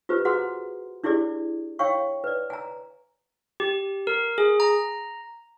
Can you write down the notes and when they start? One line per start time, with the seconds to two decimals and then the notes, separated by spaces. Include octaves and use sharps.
0.09 F4 G4 B4 C5
0.25 F#4 G#4 B4 F#5 A#5 C6
1.04 D4 E4 G4 G#4 D5
1.79 C#5 F5 G5 C#6
2.24 B4 D5
2.50 G#5 A#5
3.60 G4
4.07 A#4
4.38 G#4
4.60 A#5